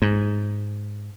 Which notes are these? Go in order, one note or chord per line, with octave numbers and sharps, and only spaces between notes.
G#2